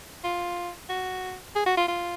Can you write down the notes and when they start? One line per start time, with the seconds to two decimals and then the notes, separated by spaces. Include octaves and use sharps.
0.24 F4
0.89 F#4
1.55 G#4
1.66 F#4
1.77 F4
1.88 F4